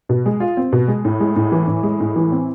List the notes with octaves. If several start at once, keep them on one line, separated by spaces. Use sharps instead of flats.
B2
G#3
F4
C4
B2
G#3
A2
G#3
A2
E3
A2
G#3
A2
E3
C4